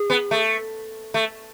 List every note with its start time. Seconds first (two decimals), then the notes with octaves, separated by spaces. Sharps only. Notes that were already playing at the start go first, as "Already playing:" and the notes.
Already playing: G#4
0.10 B3
0.31 A3
1.14 A3